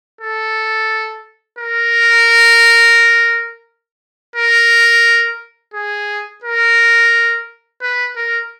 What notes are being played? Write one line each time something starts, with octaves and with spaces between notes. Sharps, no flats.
A4
A#4
A#4
G#4
A#4
B4
A#4